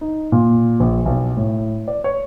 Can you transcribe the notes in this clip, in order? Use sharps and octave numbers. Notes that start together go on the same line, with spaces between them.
D#4
A#2
A#1
B1
A2
D5
C#5